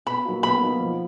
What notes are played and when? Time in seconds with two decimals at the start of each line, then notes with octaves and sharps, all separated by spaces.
0.06 B2 B5
0.25 F#3 A#3 D#4 F#4
0.43 B2 B5
0.61 F#3 A#3 D#4 F#4
0.80 F3